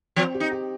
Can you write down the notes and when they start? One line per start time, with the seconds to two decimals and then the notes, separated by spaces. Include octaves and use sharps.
0.16 F3 C4
0.34 G4
0.40 D#4
0.52 G4